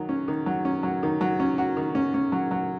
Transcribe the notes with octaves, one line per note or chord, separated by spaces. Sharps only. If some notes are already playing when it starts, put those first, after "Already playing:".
Already playing: D#3 F#3
C#4
D#3
F#3
C#4
F#3
D#3
F#3
C#4
F#4
D#3
C#4
C#4
F#3
F#3